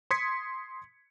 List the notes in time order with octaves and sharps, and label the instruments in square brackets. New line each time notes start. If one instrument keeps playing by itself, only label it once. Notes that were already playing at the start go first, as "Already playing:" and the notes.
[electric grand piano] C6 D#6 G#6 B6 C#7